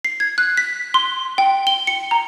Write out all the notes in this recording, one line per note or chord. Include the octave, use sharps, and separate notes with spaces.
C7
G#6
F#6
B6
C6
G5
G7
C#7
A#5